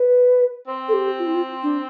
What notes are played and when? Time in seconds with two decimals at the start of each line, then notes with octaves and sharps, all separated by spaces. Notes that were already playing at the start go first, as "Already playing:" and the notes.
Already playing: B4
0.68 C4
0.88 A4
0.93 G4
1.19 F4
1.27 E4
1.35 F4
1.63 D4